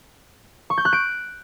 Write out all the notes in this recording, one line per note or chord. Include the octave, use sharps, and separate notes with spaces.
C#6
G6
F#6
D7